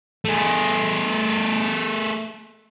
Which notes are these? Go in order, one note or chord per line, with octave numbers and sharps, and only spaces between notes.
A3 G#4